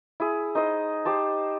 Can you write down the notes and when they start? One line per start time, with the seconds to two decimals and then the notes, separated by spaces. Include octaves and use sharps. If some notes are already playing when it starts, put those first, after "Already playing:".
0.20 E4 G#4
0.55 D#4 C5 D#5
1.05 G4 C5 A5